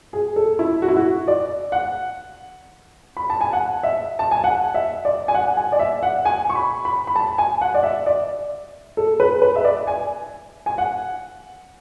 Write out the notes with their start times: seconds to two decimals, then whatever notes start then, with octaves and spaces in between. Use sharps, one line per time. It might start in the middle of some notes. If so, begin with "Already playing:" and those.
0.13 G#4
0.36 A4
0.59 E4
0.82 F#4
0.88 E4
0.97 F#4
1.28 D5
1.72 F#5
3.17 B5
3.30 A5
3.41 G#5
3.53 F#5
3.83 E5
4.19 A5
4.31 G#5
4.44 F#5
4.74 E5
5.05 D5
5.28 G#5
5.34 F#5
5.57 G#5
5.72 D5
5.79 E5
6.03 F#5
6.25 G#5
6.49 C#6
6.55 B5
6.85 B5
7.07 B5
7.16 A5
7.38 G#5
7.61 F#5
7.74 D5
7.83 E5
8.06 D5
8.97 A4
9.20 B4
9.42 B4
9.55 E5
9.65 D5
9.87 G#5
10.66 G#5
10.78 F#5